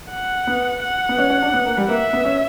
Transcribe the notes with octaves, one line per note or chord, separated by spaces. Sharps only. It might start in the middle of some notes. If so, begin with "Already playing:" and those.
F#5
B3
F#5
B3
C#4
C#4
D4
B3
A#3
G3
A#3 E5
B3
C#4